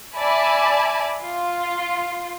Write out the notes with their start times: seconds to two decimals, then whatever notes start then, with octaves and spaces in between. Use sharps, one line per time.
0.16 D5 E5 G#5 A5 B5
1.20 F4